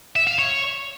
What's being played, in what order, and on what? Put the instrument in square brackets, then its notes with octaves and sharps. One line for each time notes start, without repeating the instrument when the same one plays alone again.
[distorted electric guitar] E5
F5
C#5